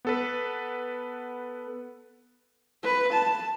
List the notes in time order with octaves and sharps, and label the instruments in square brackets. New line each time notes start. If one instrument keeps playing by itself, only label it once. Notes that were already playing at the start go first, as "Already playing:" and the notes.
[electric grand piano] B3 A4 B4
[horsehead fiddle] B4
A5